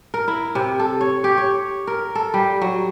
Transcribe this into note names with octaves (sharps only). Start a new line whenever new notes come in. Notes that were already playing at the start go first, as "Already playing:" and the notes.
A#4
E4
C3
A4
C#5
G4
C#5
A#4
A4
G3
F#3